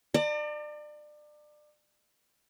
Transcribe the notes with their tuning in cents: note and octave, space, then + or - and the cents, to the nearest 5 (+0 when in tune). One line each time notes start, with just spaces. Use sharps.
D5 +30 A#5 -45